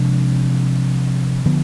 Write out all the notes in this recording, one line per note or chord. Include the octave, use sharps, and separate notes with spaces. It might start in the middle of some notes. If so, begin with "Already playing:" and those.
Already playing: C3 F3 G#3 D4
D3 F3 B3